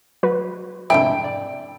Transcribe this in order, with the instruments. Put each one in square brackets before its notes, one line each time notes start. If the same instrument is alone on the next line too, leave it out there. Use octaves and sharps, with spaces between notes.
[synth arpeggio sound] F#3 F#4 B4
[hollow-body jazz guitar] F2 G#2 C3 [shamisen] A3 D4 E4 [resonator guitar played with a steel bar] G5
[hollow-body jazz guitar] D5